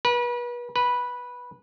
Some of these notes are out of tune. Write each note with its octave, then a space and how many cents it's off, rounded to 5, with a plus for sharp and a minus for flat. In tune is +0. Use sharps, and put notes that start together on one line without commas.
B4 -35
B4 -10